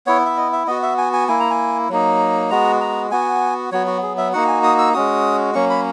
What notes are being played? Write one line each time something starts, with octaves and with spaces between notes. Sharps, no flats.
B3 E4 C#5
E5
D#5
E5
B3 F#4 D#5
E5
G#5
G#5
A#3 E4 G#5
A#5
G#5
F#3 A#3 D#4
G#3 B3 F#4 A#5
A#5
B3 F#4 G#5
F#3 B3 F#4 C#5
F#4
G#4
E5
A#3 D#4 F#4 F#5
G#5
D#6
E6
G#3 C#4 F#4 D#6
F#3 A#3 C#4 C#6
B5